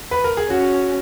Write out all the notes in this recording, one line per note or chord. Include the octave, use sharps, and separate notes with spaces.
B4
A#4
G#4
C#4 F#4